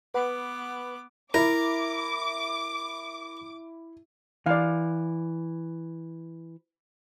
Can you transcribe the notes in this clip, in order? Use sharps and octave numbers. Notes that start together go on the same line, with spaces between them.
B3 B4 F#5 B5 D6
E4 A#4 D6
E3 D5 F5